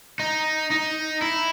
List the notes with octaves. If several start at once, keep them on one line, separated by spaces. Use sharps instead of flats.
D#4
D#4
E4